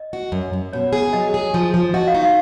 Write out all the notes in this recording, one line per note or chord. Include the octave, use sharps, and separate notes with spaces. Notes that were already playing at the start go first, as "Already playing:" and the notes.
Already playing: D#5
F#4
F#2
F#2
B2 C#5
G#4
F#3 D#5
G#4
F3
F3
F#4 D#5
F5
D#4
F5